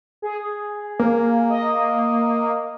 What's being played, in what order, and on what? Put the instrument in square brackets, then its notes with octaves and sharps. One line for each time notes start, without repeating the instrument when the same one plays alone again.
[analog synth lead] G#4
[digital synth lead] A#3
[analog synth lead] D#5